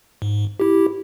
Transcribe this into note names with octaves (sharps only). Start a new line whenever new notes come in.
G#2
E4 G4